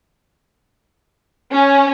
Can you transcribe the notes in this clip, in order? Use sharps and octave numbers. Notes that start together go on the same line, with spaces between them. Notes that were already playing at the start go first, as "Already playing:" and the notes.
C#4